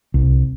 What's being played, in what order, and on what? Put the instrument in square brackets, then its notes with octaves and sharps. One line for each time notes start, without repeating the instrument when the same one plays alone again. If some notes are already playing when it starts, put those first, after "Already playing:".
[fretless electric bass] C2